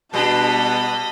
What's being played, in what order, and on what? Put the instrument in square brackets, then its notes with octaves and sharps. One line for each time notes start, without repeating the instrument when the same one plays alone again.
[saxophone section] B2 [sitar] G3 D4 [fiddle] D#5 B5 [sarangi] A5